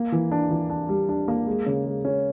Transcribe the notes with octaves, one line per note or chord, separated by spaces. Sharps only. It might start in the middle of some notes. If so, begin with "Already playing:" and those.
Already playing: A#3
E3
D4
E3
D4
G3
D4
A#3
G#3
C#3
G#3
C#4